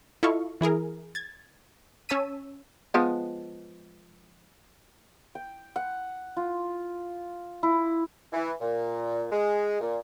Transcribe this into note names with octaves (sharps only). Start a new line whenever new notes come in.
E4 F4 A4 D#5 F5 C#6
E3 E4 G#4 A#4
G#6 A6
C#4 C#5 A5 E6 B6 D#7
F3 G#3 B3
G5
F#5
F4
E4
E3
A#2
G#3
A#2